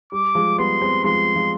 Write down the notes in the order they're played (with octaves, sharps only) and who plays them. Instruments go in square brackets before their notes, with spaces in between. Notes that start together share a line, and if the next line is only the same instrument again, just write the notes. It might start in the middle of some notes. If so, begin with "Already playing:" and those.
[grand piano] G3 [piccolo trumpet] D6
[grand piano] F3 G#3
[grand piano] G3 B3 [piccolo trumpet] C6
[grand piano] G#3 C4
[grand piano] F3 G#3 [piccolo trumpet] C6
[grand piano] F3 G#3